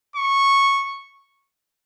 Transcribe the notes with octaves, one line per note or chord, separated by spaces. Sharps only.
C#6